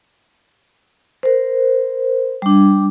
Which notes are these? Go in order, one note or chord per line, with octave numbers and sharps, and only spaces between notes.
A#4 C5
G3 D4